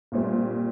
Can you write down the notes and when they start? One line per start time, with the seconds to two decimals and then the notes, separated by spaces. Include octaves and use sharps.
0.12 A#1 A#2 G3 C4